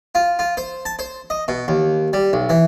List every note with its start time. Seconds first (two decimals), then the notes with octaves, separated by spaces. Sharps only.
0.15 F4
0.39 F4
0.57 C5
0.85 A5
0.99 C5
1.30 D#5
1.48 B2
1.68 D#2
2.13 G3
2.33 B1
2.49 E3